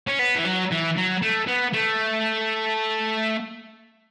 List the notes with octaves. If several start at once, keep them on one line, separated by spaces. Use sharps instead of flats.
C#4
B3
E3
F#3
E3
F#3
A3
B3
A3